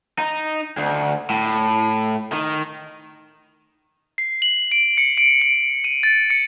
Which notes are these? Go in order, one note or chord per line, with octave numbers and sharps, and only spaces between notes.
D#4
D2
A2
D#3
C7
F#7
D7
C#7
D7
D7
D#7
A6
C#7